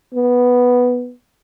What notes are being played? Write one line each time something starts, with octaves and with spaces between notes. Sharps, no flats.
B3